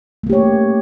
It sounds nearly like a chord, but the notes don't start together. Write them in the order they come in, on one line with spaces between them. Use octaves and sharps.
A3 A#3 G4 C#5